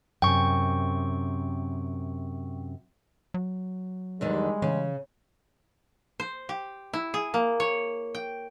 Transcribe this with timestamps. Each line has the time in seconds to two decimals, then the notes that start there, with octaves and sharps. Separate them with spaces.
0.22 F#2 C3 G5 C#6
3.34 F#3
4.21 E2 D3 D#3 G3 G#3
4.62 C#3 E3
6.20 C5
6.49 G4
6.93 E4
7.14 G#4
7.34 A#3
7.60 C#5
8.15 G5